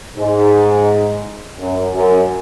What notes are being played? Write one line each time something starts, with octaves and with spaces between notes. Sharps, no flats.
G#2
F#2
F#2